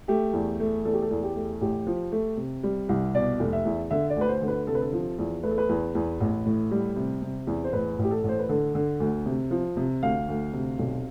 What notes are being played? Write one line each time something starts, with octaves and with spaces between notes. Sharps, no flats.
A3 G4
E2
A3
E2 A4
G4
A4
E2
G4
A3
A1 G4
F3
A3
C3
G3
C2
B2 D5
F1
E5
E2
D3 E5
D5
D2 B4
C5
D3
B4
C3 A4
B4
A4
F3
E2
A3 B4
A4
B4
E2
E2
A1
A2
G3
C3
C3
E2
C5
A1 B4
A1 G4
A4
A1
C5
B4
D3 A4
D3
D2
C3
F3
C3
D2 F5
D2
C3
B1